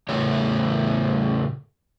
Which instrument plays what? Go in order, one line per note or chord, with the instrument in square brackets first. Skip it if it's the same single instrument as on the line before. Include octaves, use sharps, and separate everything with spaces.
[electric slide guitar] E2 A2 C#3 A3 C#5